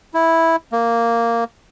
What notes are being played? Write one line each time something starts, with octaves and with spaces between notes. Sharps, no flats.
E4
A#3